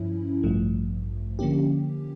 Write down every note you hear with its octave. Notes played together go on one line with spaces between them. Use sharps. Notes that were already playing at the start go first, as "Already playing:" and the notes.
Already playing: G2 F3 C#4 E4
A1 G2 F3 A3
D3 F3 A#3 C#4 G4